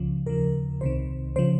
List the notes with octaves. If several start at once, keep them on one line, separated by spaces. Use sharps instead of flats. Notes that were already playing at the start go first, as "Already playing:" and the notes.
Already playing: C#2 C#3 F3
D#2 C#3 F3 A#4
C2 C3 D#3 C5
C#3 F3 C5